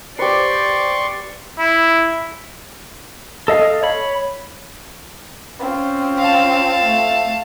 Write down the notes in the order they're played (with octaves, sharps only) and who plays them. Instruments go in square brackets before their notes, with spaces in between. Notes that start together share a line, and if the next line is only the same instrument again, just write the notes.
[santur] G4 B4 [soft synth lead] C5 [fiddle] D5 [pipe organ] C6 C#6
[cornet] E4
[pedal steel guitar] A4 D#5 F5
C#5 B5
[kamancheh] C4 F4 [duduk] C#4
[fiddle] F5 A5
[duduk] A3